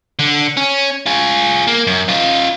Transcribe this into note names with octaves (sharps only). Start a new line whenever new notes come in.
D3
C#4
F4 G#4
A#3
F#2
D#4 F4